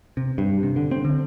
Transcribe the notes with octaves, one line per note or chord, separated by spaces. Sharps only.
C3
G2
C3
D3
C4
D3